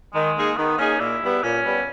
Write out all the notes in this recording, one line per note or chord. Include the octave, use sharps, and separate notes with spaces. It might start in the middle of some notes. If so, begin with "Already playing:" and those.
D#3 G#3
A#3 D#4 G#4
D#3 B3
A#3 C#4 D#4 G#4
A#2 E4
G3 B3
A#2 C#4
G3 B3